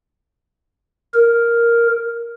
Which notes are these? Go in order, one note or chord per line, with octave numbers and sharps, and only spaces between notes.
A#4